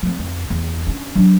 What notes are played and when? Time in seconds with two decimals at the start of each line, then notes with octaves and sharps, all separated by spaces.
0.03 F3 C4
0.19 F2
0.50 E2
0.87 C#4 D4
1.15 F#3 D4